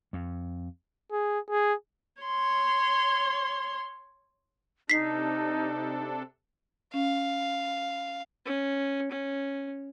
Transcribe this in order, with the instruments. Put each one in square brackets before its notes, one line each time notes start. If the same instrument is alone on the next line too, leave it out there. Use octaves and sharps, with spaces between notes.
[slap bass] F2
[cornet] G#4
G#4
[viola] C#5 C6
[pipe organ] C3 D4 A4 [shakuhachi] D#4 [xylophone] B6 C7
[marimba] C#4 [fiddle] F5
[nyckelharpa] C#4
C#4